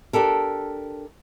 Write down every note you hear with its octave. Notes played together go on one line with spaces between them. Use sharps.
D4 G4 A4 A#4